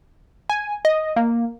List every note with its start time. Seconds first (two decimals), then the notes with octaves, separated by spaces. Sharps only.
0.50 G#5
0.85 D#5
1.16 A#3